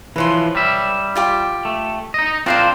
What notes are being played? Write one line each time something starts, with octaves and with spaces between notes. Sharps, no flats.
E3 F3 B4 C#5 C6
G3 E5
F4 G4 D6
A3
D#4 D#5
C4 D4 F4 A#4 C5 F5